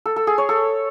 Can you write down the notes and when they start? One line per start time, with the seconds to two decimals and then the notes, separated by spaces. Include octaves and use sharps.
0.06 A4
0.16 A4
0.27 G#4
0.38 C#5
0.49 A4